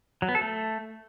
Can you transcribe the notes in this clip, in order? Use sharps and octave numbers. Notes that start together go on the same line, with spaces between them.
F#3
B3
A4
A3